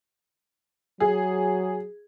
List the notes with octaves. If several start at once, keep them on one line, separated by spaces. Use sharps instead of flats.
F#3 G#4